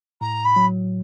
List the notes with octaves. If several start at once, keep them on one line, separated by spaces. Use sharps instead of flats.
A2 A#5
B5
F#3